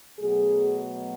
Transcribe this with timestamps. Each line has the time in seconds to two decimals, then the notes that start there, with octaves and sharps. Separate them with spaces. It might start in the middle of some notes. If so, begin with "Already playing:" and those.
0.19 B2 F#3 A3 G#4